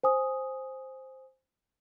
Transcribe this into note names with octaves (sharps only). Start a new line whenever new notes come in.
C5 G#5 D#6